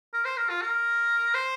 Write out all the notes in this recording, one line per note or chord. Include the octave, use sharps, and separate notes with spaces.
A#4
C5
A#4
F4
A#4
C5